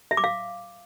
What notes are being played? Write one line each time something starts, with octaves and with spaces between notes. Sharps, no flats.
E5
D6
F5